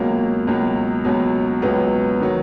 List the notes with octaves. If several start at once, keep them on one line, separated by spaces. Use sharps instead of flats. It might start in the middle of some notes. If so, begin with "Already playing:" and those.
Already playing: C#2 B2 F#3 A#3
C#2 B2 F#3
C#2 B2 F#3
C#2 B2 F#3 B3
D#3 F#3